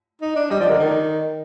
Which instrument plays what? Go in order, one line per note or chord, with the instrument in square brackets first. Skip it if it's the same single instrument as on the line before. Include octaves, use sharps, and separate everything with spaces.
[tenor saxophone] D#4
D4
[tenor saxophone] G3 [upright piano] D#5
[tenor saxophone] F3 [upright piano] D5
[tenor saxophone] D3 [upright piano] A#4
[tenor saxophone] D#3